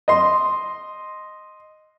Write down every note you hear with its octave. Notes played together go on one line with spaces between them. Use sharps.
D#5 C6